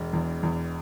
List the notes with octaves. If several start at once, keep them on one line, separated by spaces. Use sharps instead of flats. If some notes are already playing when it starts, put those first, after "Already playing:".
Already playing: E1
E2
E2